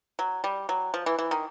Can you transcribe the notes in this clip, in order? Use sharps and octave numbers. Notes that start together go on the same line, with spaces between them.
F#3
G3
F#3
F3
E3
E3
D#3